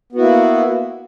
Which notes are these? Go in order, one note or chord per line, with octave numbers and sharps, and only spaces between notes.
A#3 B3 E4 F#4